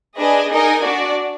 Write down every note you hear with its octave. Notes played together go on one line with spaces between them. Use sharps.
D4 G#4 B4 D#5 G#5
D#4 A#4 D#5 G#5
D4 F#4 D5